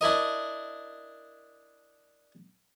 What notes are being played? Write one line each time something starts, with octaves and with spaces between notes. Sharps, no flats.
D4 E4 A#4 D#5